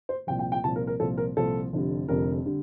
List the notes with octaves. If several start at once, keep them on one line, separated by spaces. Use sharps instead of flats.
C5
C2 A#2 F3 G5
G5
G5
C2 A#2 F3 A5
A#4
A#4
C2 A#2 F3 A4
A#4
C2 A#2 F3 A4
F1 F2 D3 G3
F1 F2 D3 G3 A#4
D3 G3